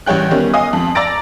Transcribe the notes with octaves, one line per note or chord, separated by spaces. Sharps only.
A1 G3 C#5 G5 F#6
D#3 G3 B3 C#4
D#5 F5 G#5 D#6
F2
D5 A#5 E6 A6 A#6 D7